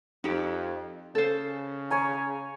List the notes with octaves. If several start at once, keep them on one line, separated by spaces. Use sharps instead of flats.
F2 D#4 G4
C#3 A4 C5
C#5 G#5 A#5